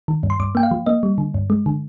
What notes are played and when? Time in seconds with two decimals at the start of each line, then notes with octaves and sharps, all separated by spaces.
0.08 D#3
0.23 G2
0.30 C6
0.40 G2 D6
0.55 A#3 G5
0.63 F5
0.71 F3
0.86 A#3 D#5
1.03 G3
1.18 D3
1.34 G2
1.50 G#3
1.66 D3